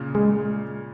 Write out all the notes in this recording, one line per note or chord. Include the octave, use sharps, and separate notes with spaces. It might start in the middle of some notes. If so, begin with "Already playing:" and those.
Already playing: A#2 C#3
G#3